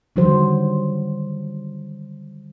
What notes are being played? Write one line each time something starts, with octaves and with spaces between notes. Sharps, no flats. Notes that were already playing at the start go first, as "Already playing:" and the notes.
D3 D#3 F#3 G3 F#4 C5